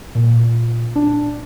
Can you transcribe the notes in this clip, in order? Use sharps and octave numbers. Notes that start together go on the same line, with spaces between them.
A#2
D4